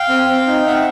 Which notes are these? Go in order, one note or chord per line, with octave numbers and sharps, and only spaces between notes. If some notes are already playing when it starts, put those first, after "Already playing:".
Already playing: F5 G5
C4
C4
D#4
C4 E5 F#5